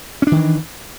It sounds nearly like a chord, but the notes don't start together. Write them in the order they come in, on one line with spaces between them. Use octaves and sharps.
C#4 D4 D#3 E3